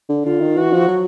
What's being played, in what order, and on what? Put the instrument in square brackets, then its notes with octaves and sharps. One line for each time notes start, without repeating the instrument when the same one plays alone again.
[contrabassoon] D3
[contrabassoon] D3 [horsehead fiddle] F4
[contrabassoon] D#3
[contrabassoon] E3 [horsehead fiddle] F#4
[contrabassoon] F3
F#3